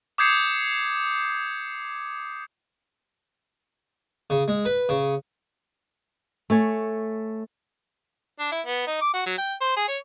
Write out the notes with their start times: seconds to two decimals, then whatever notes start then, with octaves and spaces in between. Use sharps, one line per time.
0.18 D6 D#6 G6 G#6 C7 C#7
4.30 C#3
4.48 G#3
4.65 B4
4.89 C#3
6.50 A3 C#5 G#5
8.40 D4
8.52 E4
8.66 B3
8.87 D#4
9.01 D6
9.14 F#4
9.26 F#3
9.38 G5
9.61 C5
9.76 G#4
9.88 C#5